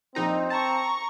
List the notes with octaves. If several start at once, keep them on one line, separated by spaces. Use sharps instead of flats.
A#1 C4 D#4 A#5
A5 A#5 C#6